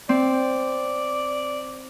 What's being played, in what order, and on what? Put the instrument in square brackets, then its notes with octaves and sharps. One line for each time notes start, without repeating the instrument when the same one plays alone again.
[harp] C4 [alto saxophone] D5